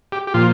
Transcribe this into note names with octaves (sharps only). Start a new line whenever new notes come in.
G4
G4
A#2 F3 F4